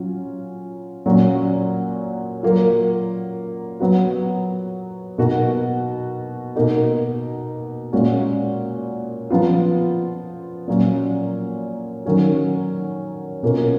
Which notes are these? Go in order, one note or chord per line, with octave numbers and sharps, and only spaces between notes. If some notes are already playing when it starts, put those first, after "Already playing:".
Already playing: F#3 C#4 F4
A#2 F#3 C#4 F#4
F#3 A#3 F4
F#3 B3 F#4
B2 A#3 D#4 F#4
B2 A#3 D#4 F#4
A#2 G#3 C#4 F#4
F3 B3 F4
A#2 F#3 C#4
D#3 F#3 C#4 F#4
B2 A#3 C#4 F4